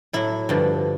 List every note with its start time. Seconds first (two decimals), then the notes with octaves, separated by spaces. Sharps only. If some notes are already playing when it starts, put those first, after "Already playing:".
0.13 A2 F#3 E4
0.49 G2 D3 F3